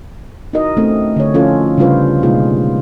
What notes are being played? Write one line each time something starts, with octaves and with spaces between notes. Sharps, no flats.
D#4 E4 F#4 A#4 D#5
A3 C4 C#4
D3 C#5
F3 C#4 E4 F4 A4
C#3 G3 D4 F4 B4 C5
B2 G#3 A#3 D#4 F4 G#4